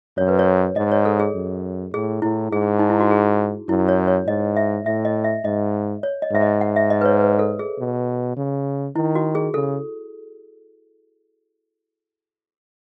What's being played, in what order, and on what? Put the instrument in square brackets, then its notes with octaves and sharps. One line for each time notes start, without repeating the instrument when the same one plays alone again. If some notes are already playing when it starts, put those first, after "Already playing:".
[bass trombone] F#2 [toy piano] C#5
[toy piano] B4
C#5
[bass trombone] G#2 [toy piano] D#5
[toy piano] C#5
A4
G#4
[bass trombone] F#2
[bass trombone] A2 [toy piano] G#4
[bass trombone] A2 [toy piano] E4
[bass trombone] G#2 [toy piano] G#4
[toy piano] D#4
E4
F#4
G#4
[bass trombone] F#2 [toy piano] E4
[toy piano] C#5
C#5
[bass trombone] G#2 [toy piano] D#5
[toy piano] E5
[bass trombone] A2 [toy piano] E5
[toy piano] D#5
E5
[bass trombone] G#2 [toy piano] D#5
[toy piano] C#5
D#5
[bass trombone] G#2 [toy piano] E5
[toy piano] D#5
F#5
E5
D#5
B4
C#5
B4
A4
G#4
[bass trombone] B2
C#3
[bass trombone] D#3 [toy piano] E4
[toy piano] F#4
G#4
[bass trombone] C#3 [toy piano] A4